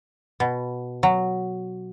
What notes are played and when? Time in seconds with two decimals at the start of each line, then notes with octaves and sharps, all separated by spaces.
0.40 B2
1.03 F#3